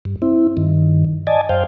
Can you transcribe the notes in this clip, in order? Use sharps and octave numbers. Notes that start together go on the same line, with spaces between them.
G2
C4 E4
G2 D#3
D5 D#5 G#5 A5
F#2 C5 F5 G5